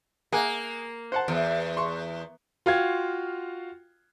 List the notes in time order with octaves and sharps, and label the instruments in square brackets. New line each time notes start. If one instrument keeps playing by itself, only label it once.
[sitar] A#3 [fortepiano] G#4 F#5 G#5
[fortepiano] C5 F#5 A5
[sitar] E2
[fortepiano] C6 C#6
[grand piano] F4 F#4 F5 G5 G#6